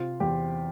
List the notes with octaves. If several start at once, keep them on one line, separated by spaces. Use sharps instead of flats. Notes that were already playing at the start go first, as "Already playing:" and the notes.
Already playing: C3 F4
E2 G4